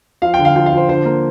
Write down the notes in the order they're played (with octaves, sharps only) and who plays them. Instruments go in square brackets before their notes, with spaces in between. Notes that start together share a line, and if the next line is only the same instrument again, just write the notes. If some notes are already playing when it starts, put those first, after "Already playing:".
[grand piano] F3 F5
G5
D3
F5
F3 G5
F5
F3 C5
D3 C5
A#3